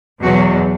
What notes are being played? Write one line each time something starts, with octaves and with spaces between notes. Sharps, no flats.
E2 B2 F#3 F#4